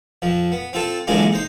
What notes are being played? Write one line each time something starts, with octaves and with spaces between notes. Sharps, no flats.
F2 F3
B3
C4 F4 A4
F#2 D3 E3 G#3 A#3 F4
D#4 C5